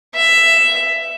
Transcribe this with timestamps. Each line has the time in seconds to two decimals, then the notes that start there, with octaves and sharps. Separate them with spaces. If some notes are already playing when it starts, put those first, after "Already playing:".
0.15 E5